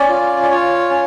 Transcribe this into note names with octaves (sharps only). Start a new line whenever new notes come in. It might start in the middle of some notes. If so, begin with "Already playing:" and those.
Already playing: C#4 D5
F4
D5
F4 C#5
C#4